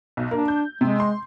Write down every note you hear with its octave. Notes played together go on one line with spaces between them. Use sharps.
B1
A#3 D4
G6
C3 G#3
C6